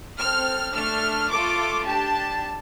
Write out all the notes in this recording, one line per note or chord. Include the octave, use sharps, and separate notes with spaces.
C4 A4 F6
A3 D4 A4 F6
A3 F4 A4 D6
D4 G4 A5